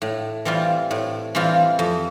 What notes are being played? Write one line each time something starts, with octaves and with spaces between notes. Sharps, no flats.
A2
E3 G3 C4 F4
A2
E3 G3 C4 F4
F2